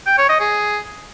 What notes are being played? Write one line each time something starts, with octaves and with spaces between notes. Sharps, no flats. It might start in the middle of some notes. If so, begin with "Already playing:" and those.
G5
C#5
D#5
G#4